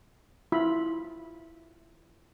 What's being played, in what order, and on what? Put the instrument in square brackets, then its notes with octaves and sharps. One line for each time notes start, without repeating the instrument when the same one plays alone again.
[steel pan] E4 F4 B5